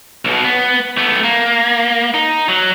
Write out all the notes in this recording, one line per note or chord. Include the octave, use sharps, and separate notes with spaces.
B1 B2
B3
A3 B3
A#3
D#4
F#3